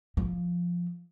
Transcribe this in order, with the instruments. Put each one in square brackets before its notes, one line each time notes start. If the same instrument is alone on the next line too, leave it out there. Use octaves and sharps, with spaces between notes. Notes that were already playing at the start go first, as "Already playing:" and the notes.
[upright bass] F3